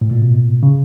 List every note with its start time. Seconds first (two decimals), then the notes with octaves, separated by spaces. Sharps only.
0.01 A2
0.11 A#2
0.22 B2
0.63 C#3